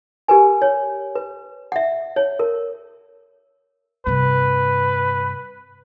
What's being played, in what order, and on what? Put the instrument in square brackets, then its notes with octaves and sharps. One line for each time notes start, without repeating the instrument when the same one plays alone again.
[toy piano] G4 A#4 B4 G#5
C#5
B4
E5 F#5
C#5
A#4
[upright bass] G2 C3 [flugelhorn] B4